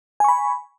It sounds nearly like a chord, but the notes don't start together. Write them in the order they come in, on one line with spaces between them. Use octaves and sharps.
G#5 C#6 B5